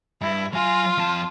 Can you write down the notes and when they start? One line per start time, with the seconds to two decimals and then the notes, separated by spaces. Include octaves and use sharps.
0.21 G2 E4
0.53 F#3 F4 G#5
0.98 F2 A5